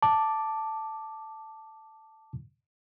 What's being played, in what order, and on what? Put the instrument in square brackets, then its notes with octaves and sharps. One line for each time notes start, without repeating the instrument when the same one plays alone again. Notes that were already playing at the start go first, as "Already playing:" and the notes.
[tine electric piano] A5 D6